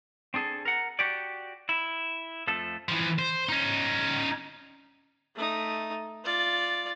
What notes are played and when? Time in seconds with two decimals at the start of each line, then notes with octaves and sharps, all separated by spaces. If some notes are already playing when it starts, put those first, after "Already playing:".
0.34 C4 D4 G#4 A4
0.65 A#4 F#5
0.99 F#4 G4 D5
1.69 E4
2.47 F2 F3 A3 A4
2.88 E3 F3
3.19 C5
3.49 C#4 D#4
5.35 A3 D#4
6.24 F4 D5